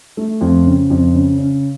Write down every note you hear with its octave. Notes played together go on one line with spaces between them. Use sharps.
A3
F2
C#3
F2
C#3
C#3